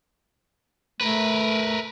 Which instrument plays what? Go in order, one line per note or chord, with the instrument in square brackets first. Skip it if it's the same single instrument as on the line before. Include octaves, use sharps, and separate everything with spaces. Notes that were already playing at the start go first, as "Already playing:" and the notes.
[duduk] A3 [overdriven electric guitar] A#4 B4